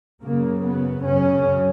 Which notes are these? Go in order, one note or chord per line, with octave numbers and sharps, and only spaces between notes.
F#2 C#3 A#3
B3
F#2 C#3 C#4